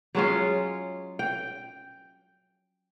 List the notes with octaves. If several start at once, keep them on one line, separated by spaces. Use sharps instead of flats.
F#3 G#3 C#4 F4
G5